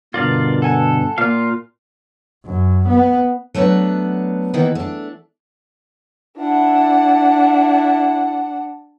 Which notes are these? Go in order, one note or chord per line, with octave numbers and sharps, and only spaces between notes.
G2 B2 D3 F4 A#4 D5 F5
A4 F#5 G#5 A5
A#2 F4 F5
F#2
B3
F#3 A3 B3 D4 B4
D#3 E3 A#3 B3 E4
A3 D4
D4 E4 F#5